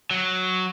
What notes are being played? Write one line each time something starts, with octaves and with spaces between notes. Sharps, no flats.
F#3